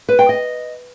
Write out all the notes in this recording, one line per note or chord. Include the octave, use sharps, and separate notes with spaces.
B4
G5
D#5